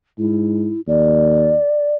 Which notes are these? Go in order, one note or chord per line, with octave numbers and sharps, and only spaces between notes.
G#2 E4
D#2 D5